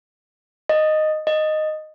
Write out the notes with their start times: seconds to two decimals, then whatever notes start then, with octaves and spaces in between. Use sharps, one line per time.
0.69 D#5
1.27 D#5